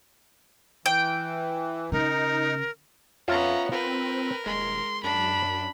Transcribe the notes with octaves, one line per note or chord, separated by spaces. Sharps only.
E3 G5
C#3 D#4 A#4
F2 B3 C#4 F4 C#5 E5 A#5
C4 F4 A#4 B4
D#1 G#3 C6
F#2 D4 B5